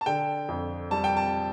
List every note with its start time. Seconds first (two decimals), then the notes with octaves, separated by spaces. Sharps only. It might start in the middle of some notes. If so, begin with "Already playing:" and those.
0.01 A5
0.06 D3 G5
0.48 F2
0.91 G3 A5
1.04 G5
1.17 A5